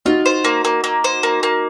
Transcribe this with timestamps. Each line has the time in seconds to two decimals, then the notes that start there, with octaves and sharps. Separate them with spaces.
0.05 D#4 F4 F#4
0.26 C5
0.45 A#3
0.65 A#3
0.84 A#3
1.04 C5
1.23 A#3
1.43 A#3